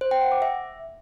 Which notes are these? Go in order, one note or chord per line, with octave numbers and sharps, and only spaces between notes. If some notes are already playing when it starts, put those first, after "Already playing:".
C5
G5
F#5
D6
E5